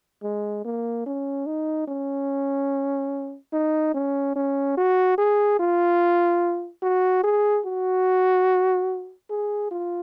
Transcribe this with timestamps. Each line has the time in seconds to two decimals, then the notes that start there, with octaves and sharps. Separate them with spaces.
0.23 G#3
0.65 A#3
1.06 C#4
1.46 D#4
1.88 C#4
3.53 D#4
3.94 C#4
4.36 C#4
4.77 F#4
5.18 G#4
5.59 F4
6.83 F#4
7.23 G#4
7.65 F#4
9.30 G#4
9.71 F4